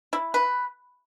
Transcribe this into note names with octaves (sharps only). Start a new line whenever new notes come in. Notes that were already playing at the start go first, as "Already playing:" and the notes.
E4
B4